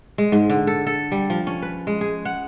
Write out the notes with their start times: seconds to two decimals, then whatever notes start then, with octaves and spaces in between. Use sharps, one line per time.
0.18 G#3
0.32 G#2
0.50 D3
0.67 A4
0.87 A4
1.12 G3
1.30 F3
1.47 C#4
1.62 B4
1.87 G#3
2.01 G#4
2.25 F#5